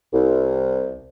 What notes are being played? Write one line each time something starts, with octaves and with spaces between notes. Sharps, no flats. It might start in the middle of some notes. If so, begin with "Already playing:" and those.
C2